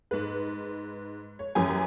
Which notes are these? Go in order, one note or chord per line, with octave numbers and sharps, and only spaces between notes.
G#2 B4
C#5
F#2 E3 C#4 G4 G#5